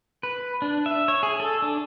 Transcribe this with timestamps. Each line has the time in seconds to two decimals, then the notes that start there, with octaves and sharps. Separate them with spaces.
0.23 B4
0.62 D4
0.86 E5
1.08 C#5
1.23 G#4
1.40 A4
1.62 D4